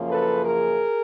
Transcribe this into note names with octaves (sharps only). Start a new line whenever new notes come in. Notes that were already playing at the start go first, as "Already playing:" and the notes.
Already playing: F#2 C#3 F3 A#3
A4 B4
G#4 A#4